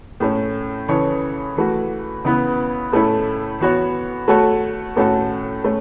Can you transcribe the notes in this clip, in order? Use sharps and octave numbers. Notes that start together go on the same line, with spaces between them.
A2 A3 C#4
C#3 E3 C#4 A4 C#5
E3 A3 F#4
C#3 E3 B3 E4 B4
A2 A3 C#4 E4 A4
E3 B3 F#4 C#5
A3 F#4 A4 C#5
A2 A3 C#4 F#4 A4
A3 C#4